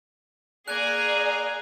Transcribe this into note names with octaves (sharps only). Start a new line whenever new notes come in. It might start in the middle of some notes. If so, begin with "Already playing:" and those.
A#3 G#4 D5 G#5 A#5 F#6 G#6